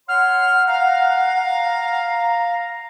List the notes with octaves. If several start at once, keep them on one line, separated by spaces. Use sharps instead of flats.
C#5 F#5 C6 F6
F5 A#5